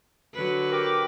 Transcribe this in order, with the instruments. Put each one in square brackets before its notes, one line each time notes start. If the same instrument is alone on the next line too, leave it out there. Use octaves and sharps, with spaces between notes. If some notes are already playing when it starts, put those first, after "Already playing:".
[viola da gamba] D3 F#3 B4
[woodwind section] G4 A#4 D6